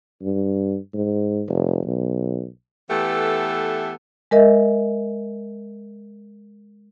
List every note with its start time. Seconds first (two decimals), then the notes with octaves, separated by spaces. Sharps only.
0.22 G2
0.93 G#2
1.49 F1
1.85 B1
2.90 E3 A3 B3 G4 A4
4.31 G#3 A#4 D#5 E5